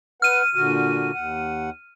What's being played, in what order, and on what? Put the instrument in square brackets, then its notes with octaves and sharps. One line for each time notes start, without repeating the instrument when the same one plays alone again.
[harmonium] B4 F#5 [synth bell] F6 D#7
[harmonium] A#2 D3 F#4
D#2 F#5